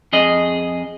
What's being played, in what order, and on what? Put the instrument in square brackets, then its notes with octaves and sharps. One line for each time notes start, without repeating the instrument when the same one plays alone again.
[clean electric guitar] F2 G#4 D#5